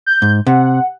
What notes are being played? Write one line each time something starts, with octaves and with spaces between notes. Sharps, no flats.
G6
G#2
C3 F#5